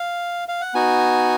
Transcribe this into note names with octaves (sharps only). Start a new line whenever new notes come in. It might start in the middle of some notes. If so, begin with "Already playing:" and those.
Already playing: F5
F5
F#5
B3 D#4 F#4 G#5